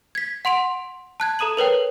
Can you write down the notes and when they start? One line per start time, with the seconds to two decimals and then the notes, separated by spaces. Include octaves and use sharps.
0.15 G#6 B6
0.45 F#5 C6 D7 F7
1.20 A5 F#6 G#6
1.39 A4 A#5 D#6 D#7 F#7
1.57 A#4 B4 C#5 G5